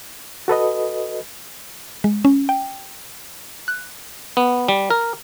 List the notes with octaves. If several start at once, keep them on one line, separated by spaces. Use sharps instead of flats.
F#4 A4 B4 D#5
G#3
C#4
G5
F#6
B3
G3
A#4